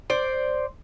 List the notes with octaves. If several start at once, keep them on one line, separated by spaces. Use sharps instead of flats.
C5 D5